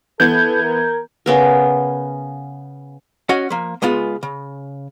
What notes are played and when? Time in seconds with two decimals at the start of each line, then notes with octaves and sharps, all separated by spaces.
0.20 E3 B3 A4 G6 G#6
0.63 A#4
1.26 C#3 B3 A#4
3.29 C#4 F#4 C#5 D#5 F#5
3.50 F3 A#3
3.82 C#2 G#3 B3 F4
4.23 C#3